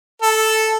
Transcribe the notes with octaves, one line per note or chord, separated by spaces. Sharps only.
A4